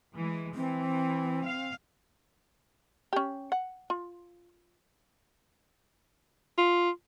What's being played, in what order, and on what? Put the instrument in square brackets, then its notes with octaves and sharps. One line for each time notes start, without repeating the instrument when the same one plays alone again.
[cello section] E3 G#3
[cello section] E3 [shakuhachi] C4
[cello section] F5
[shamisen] C#4 G4
F#5
F4
[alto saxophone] F4